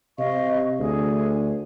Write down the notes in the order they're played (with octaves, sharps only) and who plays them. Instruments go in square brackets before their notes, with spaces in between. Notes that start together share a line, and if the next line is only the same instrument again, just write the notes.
[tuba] C3 [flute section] D#5 F5 C#6
[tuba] D2 [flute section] G#4